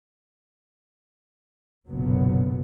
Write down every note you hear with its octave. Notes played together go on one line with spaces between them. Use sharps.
F#1 B1 A#2 D3 F#3 B3